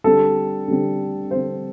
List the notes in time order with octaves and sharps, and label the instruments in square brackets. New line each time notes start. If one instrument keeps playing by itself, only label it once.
[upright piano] D3 G3 C4 A4
D3 G3 C4
D3 G3 C4 C5